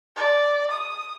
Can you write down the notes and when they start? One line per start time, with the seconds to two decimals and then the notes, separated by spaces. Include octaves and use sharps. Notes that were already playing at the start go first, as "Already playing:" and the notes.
0.16 D5
0.71 D#6